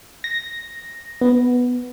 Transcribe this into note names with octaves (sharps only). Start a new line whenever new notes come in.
A#6
B3